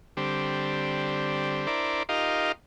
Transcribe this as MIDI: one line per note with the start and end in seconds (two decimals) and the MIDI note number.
0.17 1.67 50
0.17 1.67 55
0.17 1.67 60
1.67 2.03 62
1.67 2.03 64
1.67 2.03 70
1.67 2.03 72
1.67 2.03 74
2.09 2.52 63
2.09 2.52 65
2.09 2.52 67
2.09 2.52 70
2.09 2.52 75
2.09 2.52 77